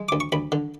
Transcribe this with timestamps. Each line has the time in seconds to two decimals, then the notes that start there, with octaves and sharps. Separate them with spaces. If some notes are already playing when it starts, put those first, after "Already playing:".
Already playing: G#3
0.09 D2 D6
0.20 C#6
0.32 D2 B5
0.52 D3